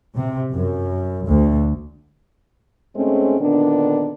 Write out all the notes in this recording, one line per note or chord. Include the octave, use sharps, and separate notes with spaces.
C3
F#2
D2
G#2 G#3 A3 C4 C#4
A#2 D3 D#3 B3 D4